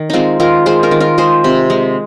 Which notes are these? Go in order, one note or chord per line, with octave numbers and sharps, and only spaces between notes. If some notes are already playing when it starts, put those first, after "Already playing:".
Already playing: D#3
G#3 C4 D#4 F4
D#3 F4 A#4
G#3 G#4 C5
F4 A#4
D#3
F4 A#4
G#3 G#4 C5
C3
G#3